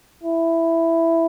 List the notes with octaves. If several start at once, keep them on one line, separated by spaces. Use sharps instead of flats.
E4